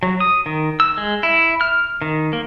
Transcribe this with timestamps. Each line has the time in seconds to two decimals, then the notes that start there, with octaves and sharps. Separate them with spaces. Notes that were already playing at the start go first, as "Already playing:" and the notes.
0.03 F#3
0.20 D#6
0.46 D#3
0.80 E6
0.98 G#3
1.23 E4
1.61 F6
2.02 D#3
2.33 A#3